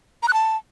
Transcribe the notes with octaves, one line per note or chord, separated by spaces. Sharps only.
A#5
F#6
A5